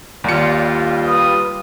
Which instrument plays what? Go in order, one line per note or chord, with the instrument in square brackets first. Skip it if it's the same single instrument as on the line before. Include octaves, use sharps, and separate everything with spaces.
[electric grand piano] D#2 C#7 [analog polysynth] G3 F4
[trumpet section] B4 D#6